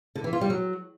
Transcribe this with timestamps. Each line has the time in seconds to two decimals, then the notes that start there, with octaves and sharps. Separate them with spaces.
0.15 D3
0.24 E3
0.33 F4
0.41 G3
0.50 F#3